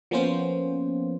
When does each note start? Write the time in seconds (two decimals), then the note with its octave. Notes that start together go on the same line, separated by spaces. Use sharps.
0.11 F3 A#3 B3 C#4 F4 C5